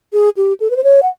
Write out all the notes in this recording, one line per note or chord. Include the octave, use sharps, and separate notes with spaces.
G#4
G4
A4
B4
C5
C#5
F#5